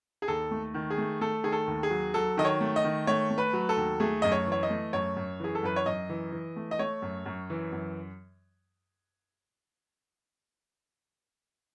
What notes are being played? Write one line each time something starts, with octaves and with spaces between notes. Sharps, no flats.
G#4
D#2 A4
A3
D#3
G#4
A3
A3 A4
D#3 G#4
A4
D#2
G#4
F#3
F#3 A4
D#3 D#5
C#5
A3
D#5
D#3
A3 C#5
A3
B4
F#3
A4
D#2
A3 G#4
F#2 D#5
C#5
E3
C#5
D#5
A3
F#2 C#5
F#2
E3 G#4
A4
F#2 B4
C#5
F#2 D#5
E3
E3
A3
D#5
A3 C#5
F#2
F#2
E3
F#2